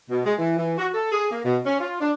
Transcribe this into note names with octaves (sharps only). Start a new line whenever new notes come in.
B2
G#3
E3
E3
F#4
A4
G#4
A#3
B2
C#4
F4
D4